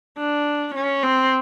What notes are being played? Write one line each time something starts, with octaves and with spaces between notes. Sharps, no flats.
D4
C#4
C4